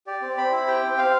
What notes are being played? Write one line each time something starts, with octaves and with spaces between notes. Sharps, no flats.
G4 D5
C4
C4 B5
E4
G4 G5
C4
C4 F5